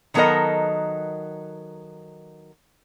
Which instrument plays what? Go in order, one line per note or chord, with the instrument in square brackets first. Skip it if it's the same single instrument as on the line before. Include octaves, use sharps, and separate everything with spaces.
[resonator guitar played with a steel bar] D#3 F#3 B3 A4 A#4 D#5